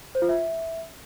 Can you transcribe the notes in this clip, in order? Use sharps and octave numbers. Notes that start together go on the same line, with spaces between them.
C5
F4
E5